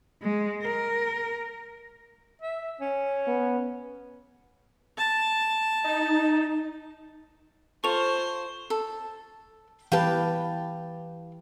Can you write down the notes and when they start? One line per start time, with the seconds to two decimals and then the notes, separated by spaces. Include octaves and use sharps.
0.22 G#3
0.62 A#4
2.42 E5
2.81 C#4
3.27 B3
4.98 A5
5.84 D#4
7.84 F4 A4 C5 C#6 F7
8.70 A4
9.92 E3 G4 B4 F5 G5 A5